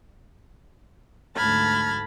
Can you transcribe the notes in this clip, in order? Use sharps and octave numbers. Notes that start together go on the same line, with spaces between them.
D2 G#2 A5 B5 F6 G#6